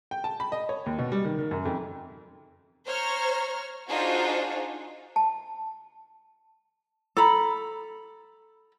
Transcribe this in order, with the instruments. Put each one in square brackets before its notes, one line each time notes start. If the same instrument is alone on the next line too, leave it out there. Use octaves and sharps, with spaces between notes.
[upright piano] G5
A5
B5
D#5
C#5
D#2
B2
G3
D#3
D#3
F#2
F2
[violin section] C5 C#5 A#5 F6
D4 D#4 F4 F#4 G#4 C5
[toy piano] A5
[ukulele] A4 A#5 B5